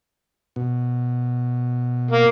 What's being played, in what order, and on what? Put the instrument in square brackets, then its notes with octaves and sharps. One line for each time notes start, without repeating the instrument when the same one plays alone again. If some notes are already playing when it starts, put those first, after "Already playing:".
[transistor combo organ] B2
[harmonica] A#3